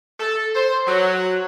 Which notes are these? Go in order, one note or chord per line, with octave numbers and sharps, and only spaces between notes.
A4
C5
F#3